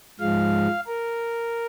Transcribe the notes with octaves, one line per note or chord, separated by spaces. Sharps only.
G#2 F3 G#3 F5
A#4